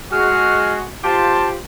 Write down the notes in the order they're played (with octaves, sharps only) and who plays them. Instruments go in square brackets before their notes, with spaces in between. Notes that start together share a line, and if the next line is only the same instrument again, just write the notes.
[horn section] G#3 F#4 [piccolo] F6
[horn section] F4 G4 C5 [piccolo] A5